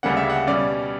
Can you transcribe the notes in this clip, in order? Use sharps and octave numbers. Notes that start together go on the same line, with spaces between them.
D2 C#3 G3 A#3 C#4 F#5
E5
F#5
B2 G3 C#4 D5